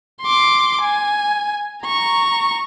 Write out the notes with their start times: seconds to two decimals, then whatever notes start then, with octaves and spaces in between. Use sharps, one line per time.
0.22 C6 D6
0.82 G#5
1.85 A#5 C#6